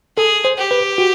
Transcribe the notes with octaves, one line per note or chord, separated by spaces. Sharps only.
G#4 A4
C5
G4
B4
F#4